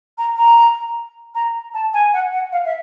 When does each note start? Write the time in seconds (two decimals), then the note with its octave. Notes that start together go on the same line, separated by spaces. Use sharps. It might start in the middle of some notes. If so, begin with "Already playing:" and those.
0.18 A#5
0.37 A#5
1.35 A#5
1.74 A5
1.94 G#5
2.13 F#5
2.33 F#5
2.52 F5
2.65 E5